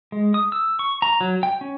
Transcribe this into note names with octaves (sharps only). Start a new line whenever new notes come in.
G#3
D#6
E6
C#6
A#5
F#3
G5
C#4